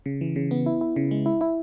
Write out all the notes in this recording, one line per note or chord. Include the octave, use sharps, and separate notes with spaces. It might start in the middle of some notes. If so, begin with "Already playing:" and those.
C#3
E3
C#3
B3
E4
E4
C#3
G#3
E4
E4